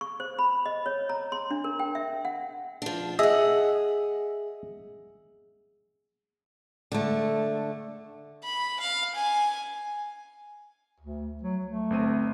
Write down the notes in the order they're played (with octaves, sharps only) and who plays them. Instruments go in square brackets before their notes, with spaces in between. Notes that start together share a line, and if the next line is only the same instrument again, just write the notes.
[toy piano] C#6
C5
B5
D#5
C#5
A#5
C6
D4
A#4
G5
E5
F#5
[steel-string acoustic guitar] F3 D4
[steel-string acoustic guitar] G#4 F#5 [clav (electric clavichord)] D#5 E5
[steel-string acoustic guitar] D3 A3
[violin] B5
F5
G#5
[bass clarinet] D2
F#3
A3
[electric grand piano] G1 C4 D#7